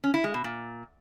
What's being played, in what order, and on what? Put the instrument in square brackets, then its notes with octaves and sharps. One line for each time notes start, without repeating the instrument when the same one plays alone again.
[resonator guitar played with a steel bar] C#4
E4
G#3
B2
A#2